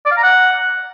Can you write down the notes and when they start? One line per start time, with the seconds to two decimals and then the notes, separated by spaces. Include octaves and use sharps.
0.06 D5
0.11 F5
0.17 A#5
0.23 F#5